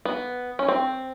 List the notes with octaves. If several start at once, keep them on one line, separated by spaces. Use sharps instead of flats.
B3
C#4
C4